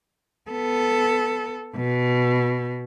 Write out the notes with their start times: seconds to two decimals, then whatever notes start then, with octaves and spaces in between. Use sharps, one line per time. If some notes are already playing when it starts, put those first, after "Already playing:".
0.50 B3 A4
1.76 B2